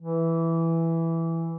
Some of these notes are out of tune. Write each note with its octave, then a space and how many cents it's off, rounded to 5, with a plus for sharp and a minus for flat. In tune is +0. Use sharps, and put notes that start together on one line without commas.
E3 +0